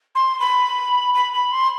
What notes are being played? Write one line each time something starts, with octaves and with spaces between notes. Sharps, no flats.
C6
B5
B5
B5
C6